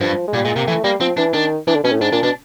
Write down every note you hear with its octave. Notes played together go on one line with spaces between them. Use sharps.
G2 F3
G#3
A#2 G3
A#2 G#3
C3 A#3
E3 A3
G3 A#3
F3 C4
E3 D4
D#3 D4
E3 D4
D3
B2 C#4
A2
G#2 D4
A#2 D4
B2 D4